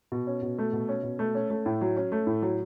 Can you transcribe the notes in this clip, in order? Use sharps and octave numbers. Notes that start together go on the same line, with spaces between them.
B2
C#4
B2
A3
B2
C#4
B2
A3
C#4
A3
A2
F#3
C#4
A3
A2
F#3